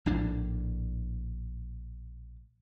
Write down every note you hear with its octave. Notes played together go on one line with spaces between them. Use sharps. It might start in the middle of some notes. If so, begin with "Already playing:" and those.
A#1 A2 D4